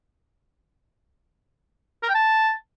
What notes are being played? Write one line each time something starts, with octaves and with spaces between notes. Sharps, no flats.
A#4
G5
A5